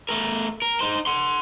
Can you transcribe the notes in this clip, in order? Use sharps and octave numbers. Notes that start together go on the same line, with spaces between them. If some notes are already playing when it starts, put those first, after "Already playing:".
A3 A#4
A#4
D#4 C5
F#5 C6